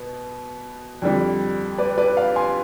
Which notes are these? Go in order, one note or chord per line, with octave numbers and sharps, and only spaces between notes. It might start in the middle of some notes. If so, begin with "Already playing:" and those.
Already playing: B2 B3
F2 D3 G3
B4 D5
B4 D5
D5 F5
G#5 C6